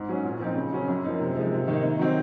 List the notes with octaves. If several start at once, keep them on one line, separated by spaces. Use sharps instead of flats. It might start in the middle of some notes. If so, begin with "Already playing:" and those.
Already playing: G#2
F#3 C#4
A#2
F3 C4 D#4
C#3
F#3 C#4
F#2
F3 A#3 D#4
C3
F3 G#3 D#4
C3
D#3 A#3 D#4
D#3
F#3 C4 D#4